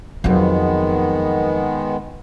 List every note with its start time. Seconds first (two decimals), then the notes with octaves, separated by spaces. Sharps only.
0.24 F2 D#3 F#3 G#3 B3